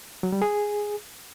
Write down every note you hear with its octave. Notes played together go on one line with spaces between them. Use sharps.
F#3
G3
G#4